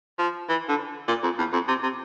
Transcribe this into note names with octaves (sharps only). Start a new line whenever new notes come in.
F3
E3
D3
A#2
F2
E2
F2
C3
C3